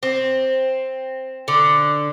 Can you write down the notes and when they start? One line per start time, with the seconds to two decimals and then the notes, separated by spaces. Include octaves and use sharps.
0.03 C4
1.48 D3